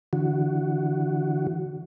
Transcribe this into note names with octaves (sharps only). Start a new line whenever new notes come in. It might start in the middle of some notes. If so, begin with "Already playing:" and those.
D3 E3 F#4